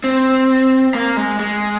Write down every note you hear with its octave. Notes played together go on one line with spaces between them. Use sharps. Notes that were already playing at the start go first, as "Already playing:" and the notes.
C4
A#3
G#3
G#3